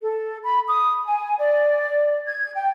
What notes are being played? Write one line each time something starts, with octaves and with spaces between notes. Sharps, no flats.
A4
B5
D#6
G#5
D5
G#6
G5